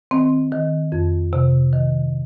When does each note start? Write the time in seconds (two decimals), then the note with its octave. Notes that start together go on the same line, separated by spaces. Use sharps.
0.11 D#3 C4
0.52 D#3
0.92 F2
1.33 C3
1.73 D#3